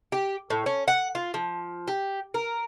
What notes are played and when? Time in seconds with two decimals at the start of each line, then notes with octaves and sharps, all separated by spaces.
0.12 G4
0.50 A2
0.66 C#4
0.88 F#5
1.15 F4
1.34 F3
1.88 G4
2.34 A#4